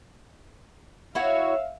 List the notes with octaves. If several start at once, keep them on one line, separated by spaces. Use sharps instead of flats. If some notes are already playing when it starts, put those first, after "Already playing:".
E4 F#4 C#5 E5 F5